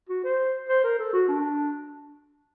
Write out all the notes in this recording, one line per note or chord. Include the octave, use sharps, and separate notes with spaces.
F#4
C5
C5
A#4
A4
F#4
D4